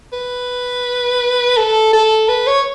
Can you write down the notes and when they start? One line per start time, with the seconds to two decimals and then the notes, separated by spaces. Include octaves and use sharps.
0.13 B4
1.57 A4
1.93 A4
2.28 B4
2.47 C#5